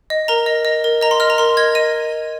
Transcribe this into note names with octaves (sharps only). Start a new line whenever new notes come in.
D#5
A#4 A#5
D#5
D#5
A#4
D#5 A#5
C6
D#5 F6
A#5
A#4 C6
D#5 G#6
D#5 D#7